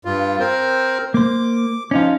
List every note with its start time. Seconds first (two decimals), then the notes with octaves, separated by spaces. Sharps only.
0.05 G2 F4
0.39 C4 A#4 C5
1.14 A#3 C5 D6
1.91 F3 C#4 D#4 F4